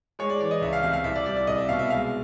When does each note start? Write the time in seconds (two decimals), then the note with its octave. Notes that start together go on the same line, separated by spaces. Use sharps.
0.19 G#3 C#5
0.30 D5
0.40 E3 D5
0.51 D#5
0.61 C#2 E5
0.73 F5
0.83 C3 F5
0.93 F5
1.04 C2 E5
1.16 D5
1.26 G3 D5
1.36 D5
1.47 C2 D#5
1.58 E5
1.69 B2 F5
1.79 E5
1.90 G#3 F5